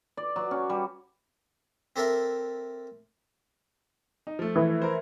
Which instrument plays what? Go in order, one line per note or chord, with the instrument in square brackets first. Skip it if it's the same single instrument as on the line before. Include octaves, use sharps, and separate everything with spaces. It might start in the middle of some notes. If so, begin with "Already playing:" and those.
[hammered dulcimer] D5
F#3
C#4
G3
[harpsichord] C4 G4 A4 A#4 E5
[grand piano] D#4
F3 A3
[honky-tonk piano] E3
[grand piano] A#4 C5